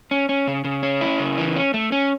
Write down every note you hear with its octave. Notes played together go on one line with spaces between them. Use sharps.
C#4
C#4
C#3
C#3
C#4
E4
C#3
E3
C#4
A3
C#4